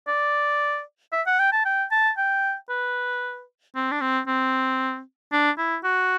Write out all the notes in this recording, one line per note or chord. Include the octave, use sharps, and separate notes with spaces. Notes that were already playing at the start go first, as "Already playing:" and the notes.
D5
E5
F#5
G5
A5
G5
A5
G5
B4
C4
D4
C4
C4
D4
E4
F#4